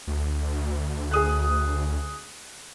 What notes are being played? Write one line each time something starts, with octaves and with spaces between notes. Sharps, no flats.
D2
G#4 D#6 F#6